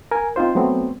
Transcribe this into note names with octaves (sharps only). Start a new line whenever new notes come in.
A#4 G#5
C4 D#4 F4 C5
F#3 A3 B3 C4